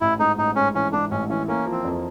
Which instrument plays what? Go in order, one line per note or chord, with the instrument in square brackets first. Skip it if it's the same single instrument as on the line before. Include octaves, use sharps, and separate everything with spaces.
[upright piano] A1 [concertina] E4
[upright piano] G#2 [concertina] D#4
[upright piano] A1 [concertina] D#4
[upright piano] G#2 [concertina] C#4
[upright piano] E3 [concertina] C#4
[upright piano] G#2 [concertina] D4
[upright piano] A1 [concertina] C#4
[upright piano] E3 [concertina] C#4
[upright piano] A#3 [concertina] C#4
[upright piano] F3
[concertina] C4
[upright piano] F2